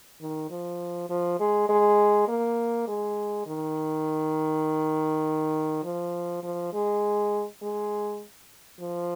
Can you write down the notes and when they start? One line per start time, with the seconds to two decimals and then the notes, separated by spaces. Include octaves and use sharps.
0.21 D#3
0.51 F3
1.10 F3
1.40 G#3
1.69 G#3
2.29 A#3
2.88 G#3
3.47 D#3
5.84 F3
6.44 F3
6.73 G#3
7.62 G#3
8.80 F3